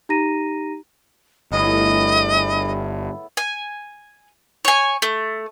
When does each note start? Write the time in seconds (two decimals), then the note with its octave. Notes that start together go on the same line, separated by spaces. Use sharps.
0.09 D#4 G4 A#5 A#6 D#7
1.52 G1 A2 B3 G#4 D#5
3.37 G#5
4.65 C#5 G#5
5.02 A3